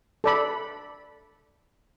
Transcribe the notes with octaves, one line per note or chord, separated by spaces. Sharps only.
A4 D5 B5